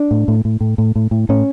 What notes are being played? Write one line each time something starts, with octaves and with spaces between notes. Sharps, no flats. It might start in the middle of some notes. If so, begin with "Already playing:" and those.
Already playing: D4
A2
A2
A2
A2
A2
A2
A2
A2 C#4